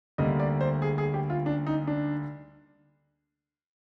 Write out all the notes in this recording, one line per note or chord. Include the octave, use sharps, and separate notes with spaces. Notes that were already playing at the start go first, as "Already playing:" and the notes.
D2 D3 G3 A#3 D#5
D5
C5
G#4
G#4
G4
F4
D4
D#4
D4